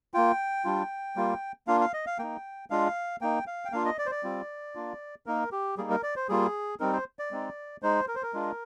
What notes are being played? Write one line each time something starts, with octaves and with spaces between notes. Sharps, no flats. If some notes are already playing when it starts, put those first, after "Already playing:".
A#3 F4 G5
G3 D4 F4
G3 A#3 F4
A#3 D4 F4 F5
F5
D#5
F5
A#3 D#4 G5
G#3 D4 F4 F5
A#3 D#4 G5
F5
G5
A#3 D4 F4 F5
D#5
D5
C5
D5
G3 C4 F4
A#3 D4 F4
A#3 D#4 A#4
G4
G3 A#3 D#4 G#4
A#4
D5
C5
G3 A#3 F4 G#4
G3 C4 D#4 A#4
C5
D5
G#3 C4 D#4
G#3 D#4 C5
A#4
C5
A#4
G#3 D4 F4